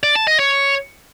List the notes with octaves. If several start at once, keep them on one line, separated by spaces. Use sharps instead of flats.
D5
A5
D#5
C#5